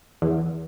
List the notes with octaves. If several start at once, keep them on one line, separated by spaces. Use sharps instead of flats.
E2